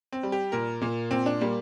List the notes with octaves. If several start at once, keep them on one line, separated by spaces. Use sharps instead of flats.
C4
G3
G4
A#2 A#4
A#2 A#3
A#2 C4
D4
G3 A#3